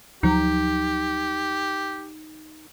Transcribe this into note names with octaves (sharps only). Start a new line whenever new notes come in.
D2 F3 F#3 D#4 G4